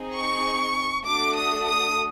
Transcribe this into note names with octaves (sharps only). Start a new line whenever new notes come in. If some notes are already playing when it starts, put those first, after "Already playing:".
Already playing: C4 D#4 G#4
C#6
A3 D4 F#4 A4 D6
D#6
D#6